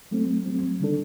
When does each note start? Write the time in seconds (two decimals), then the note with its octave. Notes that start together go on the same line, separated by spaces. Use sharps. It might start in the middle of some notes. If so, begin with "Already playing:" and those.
0.11 F#3 A3 C4
0.46 F#3 A3 C4
0.80 D3 G3 D4 A4